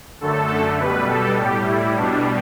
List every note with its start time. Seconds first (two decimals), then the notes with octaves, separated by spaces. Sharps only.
0.21 F#2 D3 A3 A4
0.80 B2 G3 B4
1.09 A4
1.39 A2 G3 G4
1.68 E4
1.97 B2 G3 D4